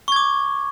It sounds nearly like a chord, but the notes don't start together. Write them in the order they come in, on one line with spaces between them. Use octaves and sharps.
C#6 G#6 D6